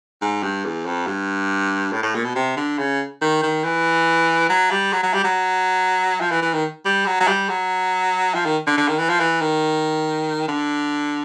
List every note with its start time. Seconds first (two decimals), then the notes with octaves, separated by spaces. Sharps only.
0.22 G#2
0.43 G2
0.65 E2
0.86 F2
1.07 G2
1.93 A2
2.03 A2
2.15 A#2
2.25 B2
2.36 C3
2.57 D3
2.78 C#3
3.22 D#3
3.43 D#3
3.64 E3
4.49 F#3
4.71 G3
4.93 F#3
5.03 F#3
5.14 G3
5.24 F#3
6.21 F3
6.31 E3
6.42 E3
6.53 D#3
6.85 G3
7.06 F#3
7.20 F#3
7.27 G3
7.49 F#3
8.35 F3
8.45 D#3
8.67 D3
8.77 D3
8.88 D#3
8.98 E3
9.09 F3
9.20 E3
9.41 D#3
10.48 D3